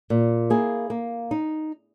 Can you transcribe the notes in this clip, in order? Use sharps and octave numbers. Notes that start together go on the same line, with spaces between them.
A#2
A#3 E4 G#4
A#3
D#4